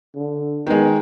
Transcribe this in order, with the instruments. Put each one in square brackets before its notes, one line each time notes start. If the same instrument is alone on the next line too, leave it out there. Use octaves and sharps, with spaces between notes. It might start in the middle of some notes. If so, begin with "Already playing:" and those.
[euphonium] D3
[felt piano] D#3 G#3 [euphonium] B3